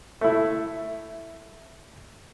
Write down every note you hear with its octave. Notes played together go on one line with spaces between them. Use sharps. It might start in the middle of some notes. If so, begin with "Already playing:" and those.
A3 E4